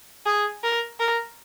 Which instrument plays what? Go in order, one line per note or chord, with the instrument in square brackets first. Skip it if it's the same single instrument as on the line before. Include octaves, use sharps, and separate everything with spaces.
[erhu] G#4
A#4
A#4